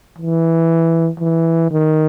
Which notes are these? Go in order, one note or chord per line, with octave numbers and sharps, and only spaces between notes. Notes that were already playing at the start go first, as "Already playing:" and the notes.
E3
E3
D#3